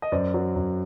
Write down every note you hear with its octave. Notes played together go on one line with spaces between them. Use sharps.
D#5
F#2 C5 D5
F#3
F#2